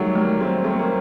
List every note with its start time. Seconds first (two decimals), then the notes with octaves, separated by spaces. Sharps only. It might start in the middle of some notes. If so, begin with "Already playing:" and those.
Already playing: D#3 F#3 G3 A3
0.15 G3 A#3
0.40 A3 C4
0.64 A3 C4
0.79 A#3